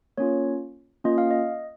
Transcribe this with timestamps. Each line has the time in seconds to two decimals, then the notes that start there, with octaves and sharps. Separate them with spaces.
0.18 A#3 C#4 F4 C#5
1.04 A#3 C#4 F4 D#5
1.18 F5
1.31 D#5